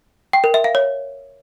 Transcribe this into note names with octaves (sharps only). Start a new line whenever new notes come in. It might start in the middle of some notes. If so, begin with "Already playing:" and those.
G5
A#4
E5
F5
C#5